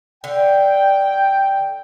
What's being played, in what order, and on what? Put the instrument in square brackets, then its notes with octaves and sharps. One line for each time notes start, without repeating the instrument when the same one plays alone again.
[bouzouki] D3 [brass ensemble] G5